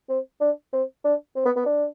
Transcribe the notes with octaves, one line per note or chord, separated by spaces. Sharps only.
C4
D4
C4
D4
C4
B3
B3
D4